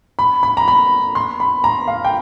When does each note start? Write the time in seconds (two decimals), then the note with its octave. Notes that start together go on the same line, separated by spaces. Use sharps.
0.19 B5
0.43 B5
0.57 A#5
0.68 B5
1.15 C6
1.40 B5
1.64 A#5
1.88 F5
2.05 G5